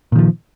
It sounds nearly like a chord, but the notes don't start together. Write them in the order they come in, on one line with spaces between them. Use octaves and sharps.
A#2 D#3 F3